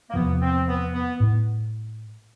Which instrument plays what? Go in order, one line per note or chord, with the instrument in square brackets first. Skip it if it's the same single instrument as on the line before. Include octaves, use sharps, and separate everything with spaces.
[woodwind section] A#3
[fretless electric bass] E2 C3 F3 [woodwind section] B3
[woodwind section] C4
B3
B3
[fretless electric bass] A2